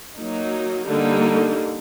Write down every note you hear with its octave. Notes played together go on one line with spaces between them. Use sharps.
F#3 A#3 D#4
D3 G3 A#3 D#4